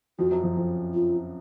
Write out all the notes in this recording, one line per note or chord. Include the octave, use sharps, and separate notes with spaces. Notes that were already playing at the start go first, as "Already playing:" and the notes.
F2 F3 F#4
F#2 F#3
F2 F3
F2 F3
F4